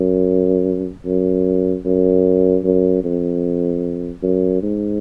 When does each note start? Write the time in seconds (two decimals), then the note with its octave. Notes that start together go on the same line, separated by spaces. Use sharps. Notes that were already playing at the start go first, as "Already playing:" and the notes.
Already playing: F#2
1.05 F#2
1.85 F#2
2.64 F#2
3.04 F2
4.22 F#2
4.62 G#2